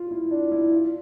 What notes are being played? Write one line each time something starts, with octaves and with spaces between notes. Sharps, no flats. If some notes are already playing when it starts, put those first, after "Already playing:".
Already playing: F4
E4
D4
E4
F4